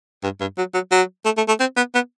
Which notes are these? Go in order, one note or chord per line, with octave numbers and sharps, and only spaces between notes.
G2
G2
F#3
F#3
F#3
A3
A3
A3
C4
B3
B3